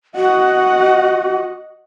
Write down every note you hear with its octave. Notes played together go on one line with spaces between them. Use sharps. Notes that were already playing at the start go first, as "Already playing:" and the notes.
F#4 D#5 F#5